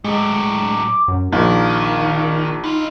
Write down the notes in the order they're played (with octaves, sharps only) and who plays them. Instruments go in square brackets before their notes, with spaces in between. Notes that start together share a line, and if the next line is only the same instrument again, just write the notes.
[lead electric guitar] A2 F#3 [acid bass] G#3 [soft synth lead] D6
[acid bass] F#2
[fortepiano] A#1 [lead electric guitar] D#3 [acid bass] D#4 [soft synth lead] F5
[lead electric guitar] E3 F4 [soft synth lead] D#4